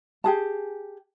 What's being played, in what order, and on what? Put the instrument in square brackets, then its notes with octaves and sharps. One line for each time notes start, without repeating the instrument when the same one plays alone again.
[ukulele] G4 G#4 A5